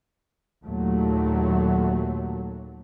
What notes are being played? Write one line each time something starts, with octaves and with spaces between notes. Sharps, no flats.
D#2 A#2 F#3 A3